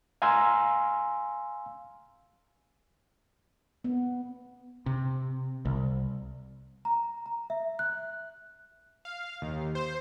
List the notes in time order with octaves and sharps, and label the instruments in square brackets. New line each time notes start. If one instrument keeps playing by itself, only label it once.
[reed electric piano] F5 G#5 A#5 C6 E6
[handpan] B3
[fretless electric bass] C3
C2
[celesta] A#5
A#5
E5
F#6
[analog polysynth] F5
D#2
C5